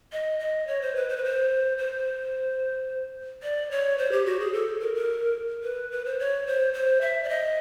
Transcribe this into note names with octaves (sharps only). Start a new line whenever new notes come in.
D#5
D#5
C#5
C5
B4
C5
B4
C5
C5
D5
C#5
C5
G4
F#4
G#4
A4
A#4
A#4
B4
B4
C5
C#5
C5
C5
E5
D5
D#5